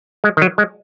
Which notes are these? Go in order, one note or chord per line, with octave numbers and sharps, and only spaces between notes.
G#3
D#3
F#3
G#3